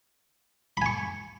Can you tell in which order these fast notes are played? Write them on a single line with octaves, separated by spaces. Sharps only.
B5 G#5 C#6